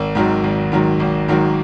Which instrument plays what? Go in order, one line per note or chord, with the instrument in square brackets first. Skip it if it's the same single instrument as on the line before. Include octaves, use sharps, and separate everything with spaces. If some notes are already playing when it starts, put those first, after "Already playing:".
Already playing: [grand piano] G#1
G#2 D#3 F#3
G#1
G#2 D#3 F#3
G#1
G#2 D#3 F#3